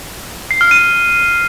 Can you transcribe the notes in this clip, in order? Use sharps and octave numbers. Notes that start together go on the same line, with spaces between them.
C7
F6
D#7